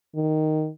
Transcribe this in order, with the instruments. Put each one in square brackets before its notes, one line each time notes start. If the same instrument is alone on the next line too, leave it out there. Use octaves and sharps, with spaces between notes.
[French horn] D#3